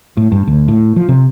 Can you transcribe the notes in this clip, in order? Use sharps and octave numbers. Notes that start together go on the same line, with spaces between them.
A2
G2
D2
A2
F3
C3